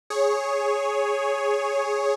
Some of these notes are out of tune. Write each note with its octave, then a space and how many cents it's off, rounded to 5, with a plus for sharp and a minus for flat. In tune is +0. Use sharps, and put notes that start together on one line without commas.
G#4 +0 C#5 +0